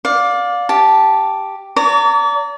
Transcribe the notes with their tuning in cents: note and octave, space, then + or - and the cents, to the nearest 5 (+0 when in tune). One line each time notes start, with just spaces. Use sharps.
D5 -5 F5 +25
G4 +0 A5 -5
D5 -40 A#5 -35 C#6 +45